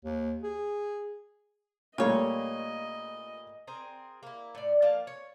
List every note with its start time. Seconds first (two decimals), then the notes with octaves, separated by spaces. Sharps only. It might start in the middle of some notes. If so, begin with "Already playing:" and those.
0.05 D#2
0.43 G#4
1.98 A#2 G3 A3 F4 C#5 D#5
3.67 C4 G#4 A#4
4.23 A#3 E4
4.55 A2 D5
4.82 F3 A#3 F5 A5
5.07 C#5